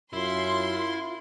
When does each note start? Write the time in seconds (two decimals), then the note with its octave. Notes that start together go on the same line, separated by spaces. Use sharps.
0.13 F#2 E4 F4 C6